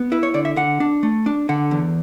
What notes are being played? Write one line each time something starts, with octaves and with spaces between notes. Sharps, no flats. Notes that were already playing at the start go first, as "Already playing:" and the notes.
Already playing: B3
E4 B4
C#5
D3 D5
E5
D3 F#5
D4
A3
D4
D3 F#5
E2